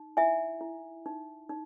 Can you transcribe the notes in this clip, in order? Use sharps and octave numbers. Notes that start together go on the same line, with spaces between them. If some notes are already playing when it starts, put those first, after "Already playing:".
Already playing: D#4
E4 E5 G#5
E4
D#4
D#4